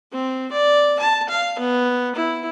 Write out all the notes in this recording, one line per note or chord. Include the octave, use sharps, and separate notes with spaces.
C4
D5
A5
F5
B3
E4